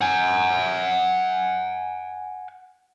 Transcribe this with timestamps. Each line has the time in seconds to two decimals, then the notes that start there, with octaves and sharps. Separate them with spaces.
0.01 F#5 G#5